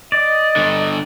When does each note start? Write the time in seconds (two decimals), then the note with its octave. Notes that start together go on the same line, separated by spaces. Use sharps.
0.12 D5 D#5
0.56 G2 D3